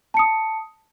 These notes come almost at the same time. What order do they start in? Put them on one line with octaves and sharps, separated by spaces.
A5 C#7 D#6